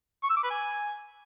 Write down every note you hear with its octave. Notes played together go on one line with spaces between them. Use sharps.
C#6
E6
D6
B4
G#5